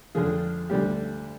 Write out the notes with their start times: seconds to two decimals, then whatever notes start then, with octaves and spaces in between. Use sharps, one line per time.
0.15 F2 D3 F3 G#4
0.70 D2 D3 G3 G4